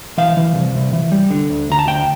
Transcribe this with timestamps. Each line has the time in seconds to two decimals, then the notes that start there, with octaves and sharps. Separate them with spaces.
0.18 E3 F5
0.37 E3
0.55 C2
0.74 C2
0.93 E3
1.12 G3
1.30 D3
1.50 D2
1.69 D2 A#5
1.79 A5
1.87 D2 G5